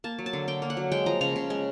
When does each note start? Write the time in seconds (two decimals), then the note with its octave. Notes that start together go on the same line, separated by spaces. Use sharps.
0.04 A#3 A5
0.19 F#3
0.26 A5
0.33 D3
0.48 D3 G5
0.62 A#3
0.70 F#5
0.77 F#3
0.92 G#3 G5
1.06 F3 A#5
1.21 C#3 A#5
1.36 C#3
1.50 G#3